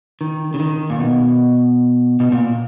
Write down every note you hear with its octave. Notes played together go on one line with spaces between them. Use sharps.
D#3
C#3
D#3
A#2
B2
B2
A#2